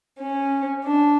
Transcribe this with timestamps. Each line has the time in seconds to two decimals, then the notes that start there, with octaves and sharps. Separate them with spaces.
0.18 C#4
0.84 D4